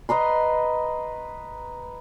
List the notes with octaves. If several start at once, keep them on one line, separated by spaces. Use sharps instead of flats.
B4 D#5 A#5 C6